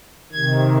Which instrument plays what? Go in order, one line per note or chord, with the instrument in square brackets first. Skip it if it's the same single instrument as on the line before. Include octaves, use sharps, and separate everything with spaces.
[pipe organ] C3 D#3 G#6